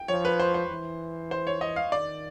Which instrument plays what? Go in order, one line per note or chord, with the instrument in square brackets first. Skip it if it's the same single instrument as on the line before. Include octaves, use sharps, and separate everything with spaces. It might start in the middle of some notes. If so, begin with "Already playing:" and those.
Already playing: [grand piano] G5
[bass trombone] F3 [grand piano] C#5
[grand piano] B4
C5
C5
[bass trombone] E3
[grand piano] C5
C#5
D#5
F5
[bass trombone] D#3 [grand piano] D5